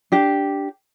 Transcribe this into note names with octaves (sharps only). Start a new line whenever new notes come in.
D4 G4